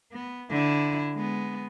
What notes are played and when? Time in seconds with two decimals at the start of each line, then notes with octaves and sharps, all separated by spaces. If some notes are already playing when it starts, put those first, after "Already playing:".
0.12 B3
0.50 D3 E4
1.15 G#3 B3